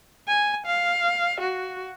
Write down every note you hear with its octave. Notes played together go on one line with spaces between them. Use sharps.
G#5
F5
F#4